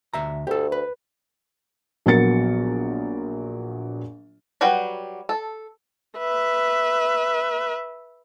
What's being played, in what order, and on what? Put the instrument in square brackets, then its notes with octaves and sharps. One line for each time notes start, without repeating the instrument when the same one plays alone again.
[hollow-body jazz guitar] D2 E5 A#5
[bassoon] D2 [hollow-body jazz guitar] G4 A4
[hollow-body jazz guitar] B4
[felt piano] A#1 F#3 B3 A#4 A6 C#7
[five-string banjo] F#3 G3 F#4 B4 G5
A4
[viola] B4 E5